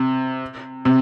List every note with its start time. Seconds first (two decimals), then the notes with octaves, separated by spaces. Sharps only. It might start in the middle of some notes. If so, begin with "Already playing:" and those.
Already playing: C3
0.85 C3